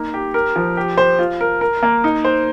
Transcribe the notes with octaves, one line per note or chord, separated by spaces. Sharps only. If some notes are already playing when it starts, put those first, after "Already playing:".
Already playing: A#3 D#4
G4
A#4
F3
G4
C5
F4
A#4
A#4
A#3
D#4
C5